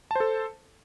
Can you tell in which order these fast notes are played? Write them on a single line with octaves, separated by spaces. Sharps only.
A5 C5 A4